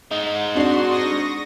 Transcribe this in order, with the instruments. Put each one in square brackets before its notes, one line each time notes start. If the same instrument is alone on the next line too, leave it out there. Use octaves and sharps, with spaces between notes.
[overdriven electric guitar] G#3 D#4
[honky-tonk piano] C4 D4 [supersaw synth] F#4 C6
[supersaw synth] C#6 D#6 A#6